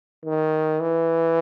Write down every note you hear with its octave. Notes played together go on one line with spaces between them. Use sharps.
D#3
E3